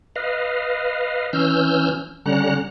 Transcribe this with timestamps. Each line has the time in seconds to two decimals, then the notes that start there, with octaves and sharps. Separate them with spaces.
0.16 B4 D#5 F5
1.33 E3 C#4 E6 F6 G6
2.26 D3 G3 C#4 F#5 A#5 F#6